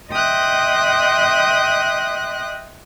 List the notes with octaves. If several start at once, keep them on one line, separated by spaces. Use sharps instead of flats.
D#5 E5 G5 C6 D#6 F#6